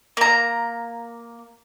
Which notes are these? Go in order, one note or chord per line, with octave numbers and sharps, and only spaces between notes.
A#3 A#5